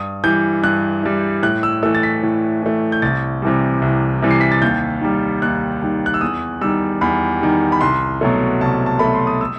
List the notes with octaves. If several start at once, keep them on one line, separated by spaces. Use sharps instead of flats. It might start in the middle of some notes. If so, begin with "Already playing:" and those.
Already playing: G2 D#6
E3 G3 G6
G2 F#6
E3 G3
A2 F#6
E6
E3 A3 E6
A6
B6
A2
E3 A3
G6
C2 A6
C3 E3 G3
C2
C3 E3 G3
C7
B6
A6
D#2 G6
D#3 G3
D#2 F#6
D#3 G3
F#6
E6
E2 D#6
D#3 G3 E6
E2 B5
D#3 G3
B5
C2 C6
B2 F#3 A3
C2 A5
A5
B2 F#3 A3 B5
C6
D#6
E6